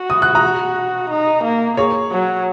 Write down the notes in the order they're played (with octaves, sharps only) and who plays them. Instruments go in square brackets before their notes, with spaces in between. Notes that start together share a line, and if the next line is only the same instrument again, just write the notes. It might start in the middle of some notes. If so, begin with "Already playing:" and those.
Already playing: [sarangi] F#4
[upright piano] D#6
F#6
A#5 D#6
[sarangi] D#4
A#3
[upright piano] G#4 C#5
[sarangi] F#3